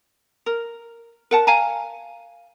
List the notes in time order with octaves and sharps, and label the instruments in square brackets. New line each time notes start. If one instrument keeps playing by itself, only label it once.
[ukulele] A#4
A#4 F#5 A5
F5 G#5 A#5